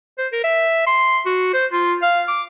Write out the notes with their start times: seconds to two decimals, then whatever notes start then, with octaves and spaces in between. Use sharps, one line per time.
0.18 C5
0.32 A#4
0.44 E5
0.87 C6
1.25 F#4
1.53 C5
1.72 F4
2.02 F5
2.28 D6